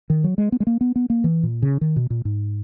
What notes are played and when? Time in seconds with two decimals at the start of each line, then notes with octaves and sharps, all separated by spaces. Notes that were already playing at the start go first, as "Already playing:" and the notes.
0.10 D#3
0.24 F#3
0.38 G#3
0.52 B3
0.60 G#3
0.67 A#3
0.81 B3
0.96 B3
1.10 A#3
1.24 E3
1.43 A#2
1.62 C#3
1.81 D#3
1.96 B2
2.10 A#2
2.25 G#2